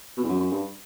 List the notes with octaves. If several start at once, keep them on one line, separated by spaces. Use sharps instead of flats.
B2
E2
F#2
F#2
G2